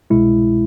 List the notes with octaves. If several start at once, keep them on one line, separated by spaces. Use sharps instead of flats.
C2 B2 G#3 E4